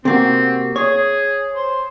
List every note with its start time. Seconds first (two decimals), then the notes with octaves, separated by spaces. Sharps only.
0.05 C3 A#3 C4 F#4
0.76 G#4 C#5
1.55 C5